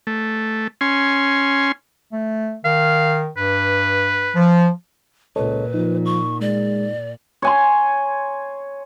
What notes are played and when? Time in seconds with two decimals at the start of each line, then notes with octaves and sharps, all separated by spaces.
0.07 A3
0.81 C#4 G#5 C6
2.12 A3
2.65 D#3 F5
3.37 G2 B4
4.35 F3
5.36 C#2 A#2 A4 B4 C#5 D#5
5.74 F3 D#4
6.06 C#6
6.41 G#3 D5
7.42 C#5 G#5 C6